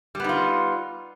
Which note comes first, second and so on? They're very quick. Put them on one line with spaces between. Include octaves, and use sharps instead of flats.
G3 B3 D#4 F4